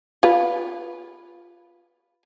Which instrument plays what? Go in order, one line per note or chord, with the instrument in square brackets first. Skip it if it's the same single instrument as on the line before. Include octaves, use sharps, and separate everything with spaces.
[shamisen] F4 B4